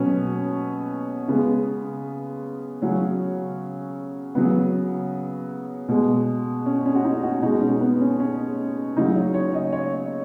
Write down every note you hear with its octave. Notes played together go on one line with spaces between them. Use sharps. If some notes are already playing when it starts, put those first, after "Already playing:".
Already playing: B2 F#3 B3 C#4
C#3 G#3 B3
C#3 F#3 C#4
C#3 F#3 B3
B2 G#3
C#4
C#4
F#4
D#4
F#4
B2 G#3 D#4
C#4
B3
C#4
C#4
C#3 F#3 D#4
C#5
C#5
D#5
C#5